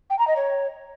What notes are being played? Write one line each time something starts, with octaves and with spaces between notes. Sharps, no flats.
G5
A#5
D#5
C#5